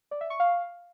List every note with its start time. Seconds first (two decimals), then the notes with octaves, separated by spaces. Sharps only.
0.11 D5
0.21 E5
0.30 C#6
0.40 F5